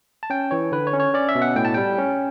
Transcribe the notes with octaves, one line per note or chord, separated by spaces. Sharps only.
A5
C#4 G5
E3 C#5
D3 B4
C#5
C#4
C#5
C#4 D5
E5
B2
F#5
A2 G5
A5
G3 G5
C#4